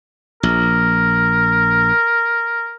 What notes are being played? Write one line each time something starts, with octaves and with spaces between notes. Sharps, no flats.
A#1 A#4